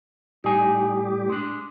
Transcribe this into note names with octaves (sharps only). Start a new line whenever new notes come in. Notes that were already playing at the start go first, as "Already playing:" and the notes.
A2 G3 D#4 G4 G#5
G#3 D4